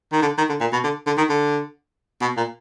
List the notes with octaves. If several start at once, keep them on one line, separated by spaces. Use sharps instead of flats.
D#3
D3
D#3
D3
A#2
B2
D3
D3
D#3
D3
B2
A#2